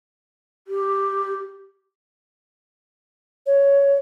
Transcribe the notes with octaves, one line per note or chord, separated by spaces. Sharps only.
G4
C#5